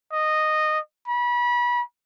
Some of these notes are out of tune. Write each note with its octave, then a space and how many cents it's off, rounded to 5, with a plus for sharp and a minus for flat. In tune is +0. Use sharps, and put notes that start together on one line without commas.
D#5 -10
B5 -30